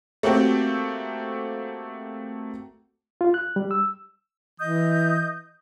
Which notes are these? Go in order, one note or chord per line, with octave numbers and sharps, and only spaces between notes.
A3 A#3 C4 F#4 G4
F4
F#6
G3
E6
E3 D#5 D#6 G6